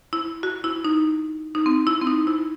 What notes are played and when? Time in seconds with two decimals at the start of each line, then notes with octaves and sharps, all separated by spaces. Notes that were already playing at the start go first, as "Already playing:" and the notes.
0.13 E4
0.43 F#4
0.64 E4
0.85 D#4
1.55 D#4
1.66 C4
1.87 E4
2.01 C4
2.07 D#4
2.27 E4